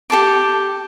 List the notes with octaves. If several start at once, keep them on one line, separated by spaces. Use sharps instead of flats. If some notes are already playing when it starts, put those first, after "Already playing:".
G4 A4 A5 D6